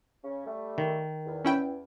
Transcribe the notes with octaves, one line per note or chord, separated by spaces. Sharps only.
C#3 C#4
G3 A3
D#3
E2
C#4 E4 G5